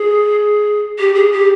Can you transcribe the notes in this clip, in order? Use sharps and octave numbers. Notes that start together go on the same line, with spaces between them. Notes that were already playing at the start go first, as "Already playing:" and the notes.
Already playing: G#4
G4
G#4
G4